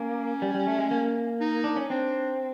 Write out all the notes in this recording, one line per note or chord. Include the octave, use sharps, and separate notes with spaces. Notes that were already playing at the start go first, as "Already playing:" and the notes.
Already playing: A#3 C#4
G3
G3
A3
G#3
A#3
D#4
D4
C#4
C4 D4